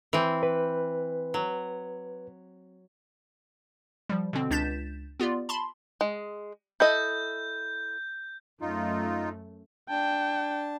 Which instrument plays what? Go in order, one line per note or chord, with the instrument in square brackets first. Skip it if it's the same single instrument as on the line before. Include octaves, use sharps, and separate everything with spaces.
[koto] E3 C4
[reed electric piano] B4
[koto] F#3
[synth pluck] F3 G3
B2 D3 C4
C#2 D4 G6 A6 B6 E7
B3 F4 G4 D5
A5 B5 C6
[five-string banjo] G#3
[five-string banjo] E4 A4 D#5 [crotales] G6
[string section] F#2 A3 [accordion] D#4 F4
[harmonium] D4 A5 [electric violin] G5